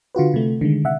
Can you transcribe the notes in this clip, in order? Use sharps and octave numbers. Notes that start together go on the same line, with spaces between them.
D3 F4 F#4 B4
C3 A3
D3 D#3 G#3
C3 E5 F#5